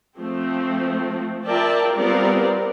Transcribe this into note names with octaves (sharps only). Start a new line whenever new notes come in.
F3 A3 C4
F4 A#4 D5 E5 G5 A5
G3 B3 C4 F4 A#4 D5